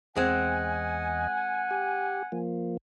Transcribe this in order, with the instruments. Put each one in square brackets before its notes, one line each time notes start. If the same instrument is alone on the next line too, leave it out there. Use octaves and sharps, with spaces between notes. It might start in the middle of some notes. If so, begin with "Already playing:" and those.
[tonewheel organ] E2 D#5 [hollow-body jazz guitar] G#3 C4 [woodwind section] F#5 G#5
[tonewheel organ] G4
F3 A#3